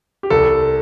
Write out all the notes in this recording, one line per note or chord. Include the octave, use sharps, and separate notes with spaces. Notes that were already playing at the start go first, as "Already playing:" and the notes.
G4
C2 A4